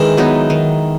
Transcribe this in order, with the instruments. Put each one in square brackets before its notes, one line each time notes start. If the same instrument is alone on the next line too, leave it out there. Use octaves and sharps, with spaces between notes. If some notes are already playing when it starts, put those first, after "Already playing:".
Already playing: [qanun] D#3 [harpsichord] E3 G#3
[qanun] F#3 B3 D#4
D#3